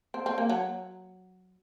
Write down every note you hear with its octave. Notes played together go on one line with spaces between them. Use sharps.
C4
C4
A#3
F#3